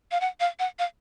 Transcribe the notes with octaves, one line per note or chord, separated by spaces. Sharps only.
F5
F#5
F5
F#5
F5